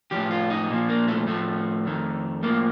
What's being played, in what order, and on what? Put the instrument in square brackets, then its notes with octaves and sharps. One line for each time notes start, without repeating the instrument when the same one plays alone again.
[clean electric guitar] A2 F3 G4
F4
D#4
A#2 F3
A#3
A3
A2 F3 A3
F2 D#3
A2 F3 A#3